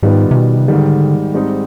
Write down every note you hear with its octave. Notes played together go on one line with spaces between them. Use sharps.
G#2 D#3 G3 B3 F4
C3
B2
C3
G#2 D3 D#3 G3
G#2 G3 C4 D#4 G#4